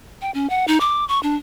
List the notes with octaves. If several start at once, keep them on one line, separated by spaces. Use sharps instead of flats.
G5
C#4
F#5
D#4
D6
C#6
D4